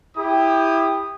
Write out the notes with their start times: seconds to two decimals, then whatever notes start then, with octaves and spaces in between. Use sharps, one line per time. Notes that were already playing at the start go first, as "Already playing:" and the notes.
0.17 E4 G4 G5 D#6